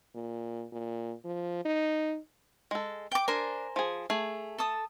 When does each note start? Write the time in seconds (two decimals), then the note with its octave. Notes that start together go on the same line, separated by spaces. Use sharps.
0.15 A#2
0.72 A#2
1.25 F3
1.65 D#4
2.71 G#3 A4
3.12 G5 D6
3.28 D4 A#4 C5 G#5
3.76 F3 G#4
4.10 A3 G#4
4.58 A4 A5 D#6